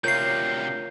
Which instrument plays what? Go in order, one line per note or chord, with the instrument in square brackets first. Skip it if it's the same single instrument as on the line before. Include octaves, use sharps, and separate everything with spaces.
[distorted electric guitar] D2 C3 [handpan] F4 A#4 C#5 [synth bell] G6 C7